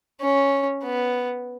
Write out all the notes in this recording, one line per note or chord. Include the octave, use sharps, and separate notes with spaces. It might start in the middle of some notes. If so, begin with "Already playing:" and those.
C#4
B3